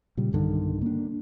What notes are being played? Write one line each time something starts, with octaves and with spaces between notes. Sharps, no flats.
A#2 C#3 G3
B1 G2 D3 D#3
A#3 D4